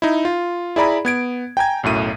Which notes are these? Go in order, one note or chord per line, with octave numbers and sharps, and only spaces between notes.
D#4 E4
F4
E4 G#4 D5 A#5 B5
B3 G#6 D7
G5 G#5 A#5 G#6
B1 F#2 A2 D#7